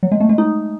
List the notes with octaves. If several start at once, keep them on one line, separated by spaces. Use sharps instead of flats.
F#3
G#3
A3
G#3
D#4